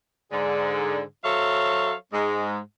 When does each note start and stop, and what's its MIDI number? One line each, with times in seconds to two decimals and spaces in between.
0.32 1.02 44
0.32 1.02 50
0.32 1.02 68
1.24 1.93 54
1.24 1.93 69
1.24 1.93 72
1.24 1.93 73
1.24 1.93 76
1.24 1.93 77
2.13 2.57 44
2.13 2.57 56